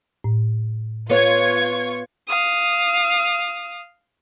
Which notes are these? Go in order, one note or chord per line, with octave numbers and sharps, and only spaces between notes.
A2
B3 F4 C#5 C#6 G#6
F5 D#6